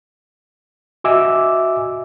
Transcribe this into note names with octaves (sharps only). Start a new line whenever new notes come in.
F#4 D#5 E5 G#5 D6 E6